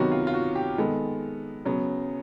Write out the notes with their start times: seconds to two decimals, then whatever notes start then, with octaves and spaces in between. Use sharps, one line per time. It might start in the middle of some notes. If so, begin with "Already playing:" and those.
Already playing: C3 D#3 F#3 B3 F#4
0.12 F4
0.27 F4
0.34 F#4
0.55 G4
0.78 D#3 G#3 B3 A4
1.65 C#3 F#3 B3